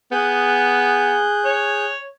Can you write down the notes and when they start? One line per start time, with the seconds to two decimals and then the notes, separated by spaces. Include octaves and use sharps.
0.12 B3 G#4 F#6 G6
1.45 C#5